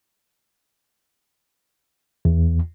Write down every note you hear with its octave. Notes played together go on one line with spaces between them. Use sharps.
E2